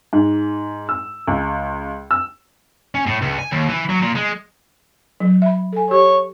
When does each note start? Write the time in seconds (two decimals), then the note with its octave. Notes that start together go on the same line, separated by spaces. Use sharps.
0.13 G#2
0.89 E6
1.27 C#2
2.11 E6
2.95 C#4
3.07 A2
3.22 C#2
3.39 G#5
3.52 D#2
3.69 E3
3.90 F#3
4.02 A#2
4.16 G#3
5.20 F#3
5.42 E5 B5
5.73 A4 G#5
5.91 G4 C#5